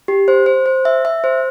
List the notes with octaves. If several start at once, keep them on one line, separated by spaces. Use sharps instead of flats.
G4
C5
C5
C5
E5
E5
C5